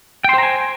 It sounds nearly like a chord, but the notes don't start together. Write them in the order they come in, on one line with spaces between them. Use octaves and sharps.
G5 C6 C5 A#5 G#5